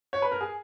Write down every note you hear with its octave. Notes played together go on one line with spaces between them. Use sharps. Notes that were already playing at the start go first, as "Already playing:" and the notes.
C#5
B4
A#4
G#4